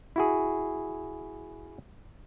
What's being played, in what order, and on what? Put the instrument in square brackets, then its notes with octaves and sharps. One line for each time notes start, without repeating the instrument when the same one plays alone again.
[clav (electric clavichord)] E4 F#4 G#4